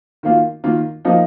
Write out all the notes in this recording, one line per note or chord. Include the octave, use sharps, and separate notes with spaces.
D#3 A#3 F4
D#3 A#3 F4
F3 A#3 D#4